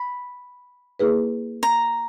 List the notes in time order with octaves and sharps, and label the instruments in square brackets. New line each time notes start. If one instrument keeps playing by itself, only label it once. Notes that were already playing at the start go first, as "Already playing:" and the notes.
Already playing: [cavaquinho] B5
[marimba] A#3 E4 G#4 B4
[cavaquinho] A#5